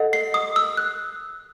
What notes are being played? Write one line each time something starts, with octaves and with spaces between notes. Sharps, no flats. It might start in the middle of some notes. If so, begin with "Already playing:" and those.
Already playing: A4 D#5 F#5
C7
D#6
E6
F#6